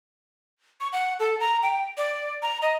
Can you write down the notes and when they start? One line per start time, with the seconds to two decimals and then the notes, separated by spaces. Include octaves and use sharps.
0.80 C#6
0.93 F#5
1.20 A4
1.40 A#5
1.63 G5
1.97 D5
2.42 A#5
2.62 D#5